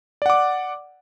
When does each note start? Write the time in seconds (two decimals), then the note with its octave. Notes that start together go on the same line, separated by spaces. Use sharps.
0.22 D5
0.26 F#5
0.30 D6